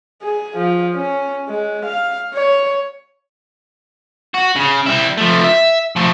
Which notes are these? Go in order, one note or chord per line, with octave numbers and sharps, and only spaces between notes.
G#4
F3
C#4
G#3
F5
C#5
F#4
C#3
G3 E4
F3 A3
E5
F3 A3